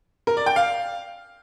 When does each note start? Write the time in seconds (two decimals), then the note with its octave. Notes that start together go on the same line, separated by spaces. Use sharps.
0.27 A#4
0.37 D5
0.46 G5
0.56 F5